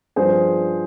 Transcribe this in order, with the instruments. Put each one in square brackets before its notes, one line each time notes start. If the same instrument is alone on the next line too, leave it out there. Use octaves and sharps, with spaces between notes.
[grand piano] G2 F3 G#4 C5